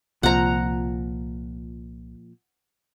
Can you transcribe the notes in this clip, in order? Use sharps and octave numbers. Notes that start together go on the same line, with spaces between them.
C2 A#2 F3 F#5 A#5